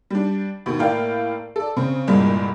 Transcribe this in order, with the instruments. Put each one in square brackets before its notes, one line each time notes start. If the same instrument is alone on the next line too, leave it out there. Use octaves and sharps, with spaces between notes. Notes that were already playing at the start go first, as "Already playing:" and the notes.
[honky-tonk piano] G3 D4
D2 B2 D#3
A2 A3 A#3 D5 F5 G5
A4 D5
C#3 C4
G1 C2 G2 A#2 G#3 D5